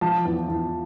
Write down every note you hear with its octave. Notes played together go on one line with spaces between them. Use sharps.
F3 A5
E2
E2